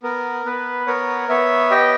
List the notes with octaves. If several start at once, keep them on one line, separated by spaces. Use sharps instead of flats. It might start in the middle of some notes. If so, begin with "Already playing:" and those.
B3 A#4
B3 B4
B3 A#4 C#5
B3 C#5 E5
G4 D#5 G5